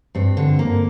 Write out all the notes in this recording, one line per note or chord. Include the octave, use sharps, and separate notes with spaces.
G2 C4
D3
A#3